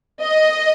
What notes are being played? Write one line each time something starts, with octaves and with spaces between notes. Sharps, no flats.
D#5